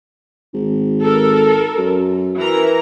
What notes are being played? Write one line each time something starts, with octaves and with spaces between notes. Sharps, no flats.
G#1
A4 A#4
F#2
E3 A#4 A#5